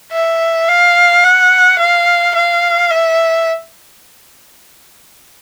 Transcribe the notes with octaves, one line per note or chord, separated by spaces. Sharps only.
E5
F5
F#5
F5
F5
E5